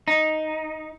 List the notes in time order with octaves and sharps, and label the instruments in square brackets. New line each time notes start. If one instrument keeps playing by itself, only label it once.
[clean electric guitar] D#4